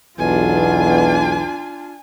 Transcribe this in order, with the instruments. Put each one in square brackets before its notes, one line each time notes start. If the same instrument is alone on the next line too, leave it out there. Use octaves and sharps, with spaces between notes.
[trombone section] B1 E2 [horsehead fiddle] D4 F4 [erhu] G#5